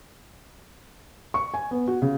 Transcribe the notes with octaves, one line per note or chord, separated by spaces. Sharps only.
C#6
G#5
B3
F#4
C#3